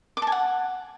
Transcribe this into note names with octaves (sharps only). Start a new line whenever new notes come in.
D6
A5
G#5
F#5